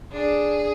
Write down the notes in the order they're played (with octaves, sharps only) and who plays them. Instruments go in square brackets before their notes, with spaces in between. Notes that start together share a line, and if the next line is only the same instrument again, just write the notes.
[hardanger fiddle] D4 [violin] G#4